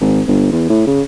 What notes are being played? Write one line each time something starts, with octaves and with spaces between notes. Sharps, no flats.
G#1
G1
E2
A2
C#3